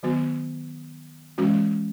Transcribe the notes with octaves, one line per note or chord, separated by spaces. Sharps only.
D#3 F#3 B3 F#4
E3 G#3 C#4 F#4